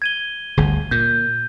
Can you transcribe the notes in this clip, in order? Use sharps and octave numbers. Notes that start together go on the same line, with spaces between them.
G#6 D#7 G7
G1 D2
A#2 G6